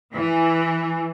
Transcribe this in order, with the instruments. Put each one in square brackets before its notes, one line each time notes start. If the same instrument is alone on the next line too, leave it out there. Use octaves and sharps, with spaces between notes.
[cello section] E3